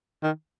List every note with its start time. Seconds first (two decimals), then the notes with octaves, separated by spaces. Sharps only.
0.23 D#3